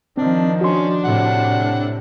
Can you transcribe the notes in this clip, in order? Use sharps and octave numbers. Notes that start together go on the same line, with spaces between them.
D#3 F3 C4 D4
C#4 D4 F#4 C6
A2 C3 F#5